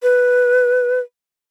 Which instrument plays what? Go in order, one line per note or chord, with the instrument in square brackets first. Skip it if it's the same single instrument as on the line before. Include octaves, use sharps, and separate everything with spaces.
[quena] B4